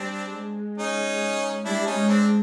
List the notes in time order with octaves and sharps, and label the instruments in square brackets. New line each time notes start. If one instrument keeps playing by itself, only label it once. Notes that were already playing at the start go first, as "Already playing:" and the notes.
Already playing: [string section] G3 [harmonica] C4 D4
[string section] G#3
[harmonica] C#4 D#4
[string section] G3 [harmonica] D4 E4
[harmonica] C#4 D#4
[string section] G#3
[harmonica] C4 D4